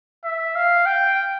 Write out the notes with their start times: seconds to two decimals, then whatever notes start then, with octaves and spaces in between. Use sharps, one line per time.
0.25 E5
0.56 F5
0.86 G5